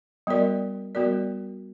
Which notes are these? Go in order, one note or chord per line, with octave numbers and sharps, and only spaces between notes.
G3 B3 F#4 A#4 D5
G3 B3 F#4 A#4 D5